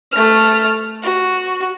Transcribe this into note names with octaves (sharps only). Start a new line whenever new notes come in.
A3 F6
F#4